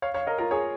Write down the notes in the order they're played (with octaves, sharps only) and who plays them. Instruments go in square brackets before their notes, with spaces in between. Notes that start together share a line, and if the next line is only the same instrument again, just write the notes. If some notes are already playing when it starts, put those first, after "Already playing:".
[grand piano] C#5 F5
C#5 F5
A#4 D#5
F4 A#4
G#4 C#5